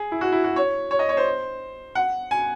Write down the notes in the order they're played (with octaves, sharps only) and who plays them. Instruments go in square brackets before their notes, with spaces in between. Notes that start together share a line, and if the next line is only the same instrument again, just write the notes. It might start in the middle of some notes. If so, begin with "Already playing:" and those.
Already playing: [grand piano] G#4
E4
F#4
E4
F#4
C#5
C#5
D#5
C#5
C5
F#5
G#5